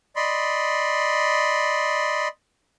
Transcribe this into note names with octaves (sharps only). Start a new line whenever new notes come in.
D5 D#5 B5 C6